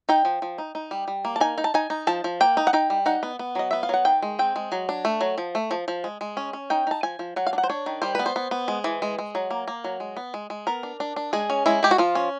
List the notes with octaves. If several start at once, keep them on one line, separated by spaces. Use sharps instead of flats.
D#4 G5
F3
F3
D#4
D#4
G3
G3
A#3
A5
D#4 G#5
D#4
A5
D#4 G#5
D#4
F3 A5
F3
A#3 G5
D#4
F#5
D#4 G5
G3
D#4 F#5
B3
B3
F#3 D#5
B3 E5
F5
F#3 F#5
D#3 G5
G#3
C4 G5
G#3
F#3
D4
A3
F#3
F3
A3
F3
F3
G#3
G#3
C#4
C#4
D#4 G5
D#4 A5
F3 G#5
F3
F#3 F#5
F5
D4
F#5
C5
D4 C#5
D#3
G3 C5
B3 B4
C5
B3
B3
G#3
E3
G#3
G#3
F#3
A#3
A#3
F#3
G#3
B3
G#3
G#3
B3 A#4
D4
D4
D4
G#3 G#4
C#4
G#3 E4
G#3 G4
F#4
F3 F4
C#4